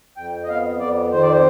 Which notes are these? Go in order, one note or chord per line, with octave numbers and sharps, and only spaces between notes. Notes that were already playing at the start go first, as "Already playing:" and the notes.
F2 G5
D#5
B3 F5
F2 D5
D#3 C5
D5
C5